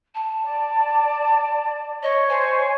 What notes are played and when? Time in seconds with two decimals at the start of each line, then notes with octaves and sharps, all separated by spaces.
0.14 A5
0.43 D5
2.02 C#5 D#5
2.29 C5 G#5